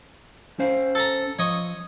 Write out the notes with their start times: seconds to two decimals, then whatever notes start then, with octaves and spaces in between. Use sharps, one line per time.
0.59 C#4 C5 F5
0.95 A4 A5 A#5
1.39 F3 C#5 D#5 C#6